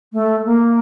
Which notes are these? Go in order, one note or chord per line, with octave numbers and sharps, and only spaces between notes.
A3
A#3